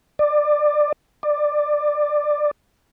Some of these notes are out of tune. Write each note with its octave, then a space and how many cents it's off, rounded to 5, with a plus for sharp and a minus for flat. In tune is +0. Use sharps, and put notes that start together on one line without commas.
D5 +20
D5 +15